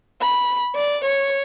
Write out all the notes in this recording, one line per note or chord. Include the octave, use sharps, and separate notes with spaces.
B5
D5
C#5